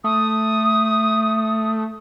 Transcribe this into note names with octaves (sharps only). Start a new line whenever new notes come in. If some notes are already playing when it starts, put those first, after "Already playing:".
A3 D#6